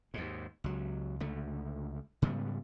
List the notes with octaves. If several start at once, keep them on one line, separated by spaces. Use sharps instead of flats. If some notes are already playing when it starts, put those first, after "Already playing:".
D#2 G#2
C#2 F#3
C#2 D3 A3
G#2 C#3 G3 B3